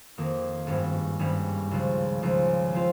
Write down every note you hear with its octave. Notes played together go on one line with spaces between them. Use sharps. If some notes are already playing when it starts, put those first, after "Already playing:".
F2 D#3 A#3
G#1 G2 G3 C#4
G#1 G2 G3 C#4
C#2 C#3 F3
C#2 C#3 F3
F3 C4 F4